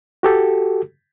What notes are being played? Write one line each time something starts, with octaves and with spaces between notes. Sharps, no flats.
F#4 G4 A4